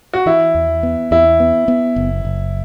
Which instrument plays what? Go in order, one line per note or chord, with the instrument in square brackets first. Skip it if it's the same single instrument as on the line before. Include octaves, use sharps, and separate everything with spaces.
[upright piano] F#4
[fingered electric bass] E3 [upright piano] E4
[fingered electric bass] E2
B3
[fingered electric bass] E2 [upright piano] E4
[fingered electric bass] B3
B3
F#1
F#1